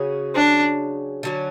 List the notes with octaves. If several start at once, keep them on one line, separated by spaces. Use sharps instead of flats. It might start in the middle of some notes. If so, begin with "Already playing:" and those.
Already playing: C#3 F#3 C#4 G#4
D4
D3 F#3 C#4